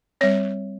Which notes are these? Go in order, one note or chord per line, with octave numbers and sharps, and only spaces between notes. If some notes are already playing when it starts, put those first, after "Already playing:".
G3 C4 C#5